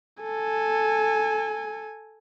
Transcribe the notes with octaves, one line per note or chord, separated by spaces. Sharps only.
A4 G#5